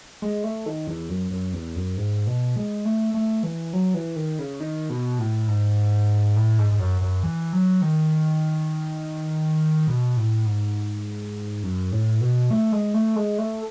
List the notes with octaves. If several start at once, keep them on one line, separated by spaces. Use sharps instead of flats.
G#3
A3
D#3
E2
F#2
F#2
E2
F#2
G#2
B2
G#3
A3
A3
E3
F#3
E3
D#3
C#3
D#3
B2
A2
G#2
A2
G#2
G#2
F#2
F#2
E3
F#3
D#3
B2
A2
G#2
F#2
A2
B2
A3
G#3
A3
G#3
A3